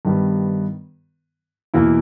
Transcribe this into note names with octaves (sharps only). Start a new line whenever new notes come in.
G2 D#3 G3 B3
E2 B2 A#3 E4